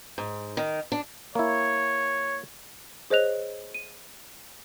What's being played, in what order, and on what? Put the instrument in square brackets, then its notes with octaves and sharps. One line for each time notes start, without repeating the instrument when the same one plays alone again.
[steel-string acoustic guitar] G#2
D#3
D4
[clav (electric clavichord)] A#3 E4 [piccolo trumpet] C#5
[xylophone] G#4 C5 C#5 D#5 F#6 F7
D#7